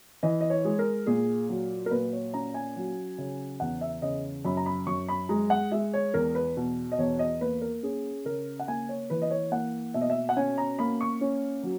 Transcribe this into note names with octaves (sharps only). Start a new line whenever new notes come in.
E3 D#5
D#5
C#5
G#3
A#4
A#2 G#4
F#3
A#4
A#2 B4
C#5
C#4 A#5
G#5
F#3
C#3
E2 F#5
E5
C#3 D#5
F#2 B5
A#5
B5
F#2 C#6
B5
G#3 A#5
F#5
G#3 E5
C#5
E2 A#4
B4
B2
D#5
E2 C#5
D#5
A#3 B4
A#4
C#4 G#4
C#3 A#4
F#5
A#3 G#5
C#5
E3 B4
D#5
C#5
A#3 F#5
B2 E5
D#5
E5
F#5
C#4 G#5
A#5
A#3 B5
C#6
C#4
F#3